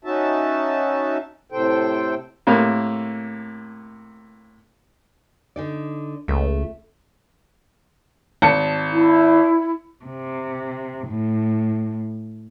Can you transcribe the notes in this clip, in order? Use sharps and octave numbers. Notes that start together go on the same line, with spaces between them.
C#4 D#4 F#4 E5 A5
A2 C3 A4 C5 G5
A2 C3 A#3
D3 D#4 D5
C#2 A3
G#1 A5 C#7
E4
C3
A2